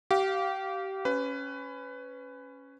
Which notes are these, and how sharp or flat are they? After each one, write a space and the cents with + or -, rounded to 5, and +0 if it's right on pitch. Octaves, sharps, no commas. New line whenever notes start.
G4 -25 F5 +0
C#4 +0 B4 +20